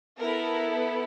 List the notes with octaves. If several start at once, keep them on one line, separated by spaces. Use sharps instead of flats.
B3 E4 A4 A#4